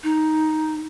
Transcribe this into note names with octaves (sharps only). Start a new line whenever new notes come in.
D#4